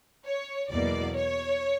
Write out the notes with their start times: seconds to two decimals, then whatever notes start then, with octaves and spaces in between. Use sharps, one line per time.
0.25 C#5
0.70 E2 B2 F#3 A#3 D5
1.15 C#5